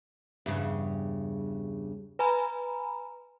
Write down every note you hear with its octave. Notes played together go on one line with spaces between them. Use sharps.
E2 G2 C#3
B4 G#5 A#5 B5